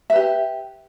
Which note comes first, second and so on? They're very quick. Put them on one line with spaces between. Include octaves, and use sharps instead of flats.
E5 B4 G4